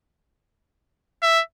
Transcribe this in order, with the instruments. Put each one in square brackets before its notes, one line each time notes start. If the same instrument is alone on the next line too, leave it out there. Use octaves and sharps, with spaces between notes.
[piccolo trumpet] E5